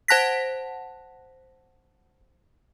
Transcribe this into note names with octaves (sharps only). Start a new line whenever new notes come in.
C5 F#5 A5 F#6 A#6 B6